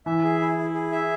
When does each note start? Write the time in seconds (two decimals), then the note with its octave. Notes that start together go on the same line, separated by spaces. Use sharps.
0.06 E3 E5
0.24 G#4
0.41 E4
0.58 E4
0.74 G#4
0.92 E5